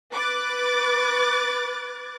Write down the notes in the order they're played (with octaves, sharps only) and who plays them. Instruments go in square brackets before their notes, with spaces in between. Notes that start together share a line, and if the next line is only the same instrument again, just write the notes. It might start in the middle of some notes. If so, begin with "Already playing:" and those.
[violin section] B4 D6 F#6 A6